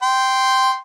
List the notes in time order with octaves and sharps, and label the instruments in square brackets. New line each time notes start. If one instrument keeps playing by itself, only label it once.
[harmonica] G5 C6